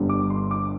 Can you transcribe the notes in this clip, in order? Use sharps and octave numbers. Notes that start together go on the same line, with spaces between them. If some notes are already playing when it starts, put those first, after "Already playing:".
Already playing: G1 G2 D3 G3
D6
C6
D6